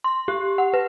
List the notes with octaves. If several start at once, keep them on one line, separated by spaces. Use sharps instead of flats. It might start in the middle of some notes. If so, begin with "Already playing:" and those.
C6
G4
F#5
B4